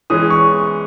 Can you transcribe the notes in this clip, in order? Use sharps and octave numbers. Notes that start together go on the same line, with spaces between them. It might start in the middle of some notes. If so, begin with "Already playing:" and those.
E3 G#3 C#4 D#6
C#6